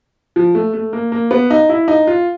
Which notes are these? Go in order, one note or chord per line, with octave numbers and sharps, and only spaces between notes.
F3
A3
A3
A#3
A#3
B3
D#4
E4
D#4
F4